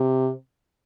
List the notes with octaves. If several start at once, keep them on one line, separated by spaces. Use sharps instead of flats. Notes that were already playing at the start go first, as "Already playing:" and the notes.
Already playing: C3